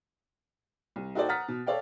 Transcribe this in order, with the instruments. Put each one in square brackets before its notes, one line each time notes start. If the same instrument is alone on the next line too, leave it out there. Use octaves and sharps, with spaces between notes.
[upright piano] C2
D#4 F#4 A4 C5 D5 G5
F#5 A#5 D#6 F6 A6 B6
B2
A4 C#5 D5 F5 G5